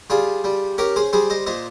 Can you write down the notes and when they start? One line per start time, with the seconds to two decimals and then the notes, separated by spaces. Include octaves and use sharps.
0.10 G3 F4 G#4
0.44 G3
0.78 C#4 G4 A#4
0.96 G#4 C5
1.13 G3 G#4 C5
1.30 C5 D#5
1.47 A#2 C5 D#5